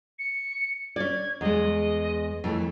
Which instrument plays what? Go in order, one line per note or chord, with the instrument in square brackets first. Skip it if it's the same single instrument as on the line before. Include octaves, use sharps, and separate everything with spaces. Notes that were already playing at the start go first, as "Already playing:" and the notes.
[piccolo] C#7
[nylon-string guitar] C#4 D5 [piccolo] G#6
[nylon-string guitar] E2 G#3 [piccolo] D#5
[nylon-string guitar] F2 E3 A3